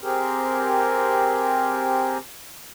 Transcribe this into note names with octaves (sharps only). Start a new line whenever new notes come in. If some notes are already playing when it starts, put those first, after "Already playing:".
C4 G4 G#4 A#4